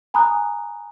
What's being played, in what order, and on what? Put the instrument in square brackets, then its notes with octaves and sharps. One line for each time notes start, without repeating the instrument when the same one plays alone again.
[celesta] G#5 A#5 B5 D#6 F#6